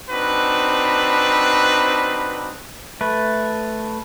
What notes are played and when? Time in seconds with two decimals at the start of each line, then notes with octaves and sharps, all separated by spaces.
0.10 C4 D4 D#4 F#4 B4
3.01 A3 B4